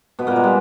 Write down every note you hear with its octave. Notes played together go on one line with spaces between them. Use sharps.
B2 B3
A#2 A#3
G#3
G3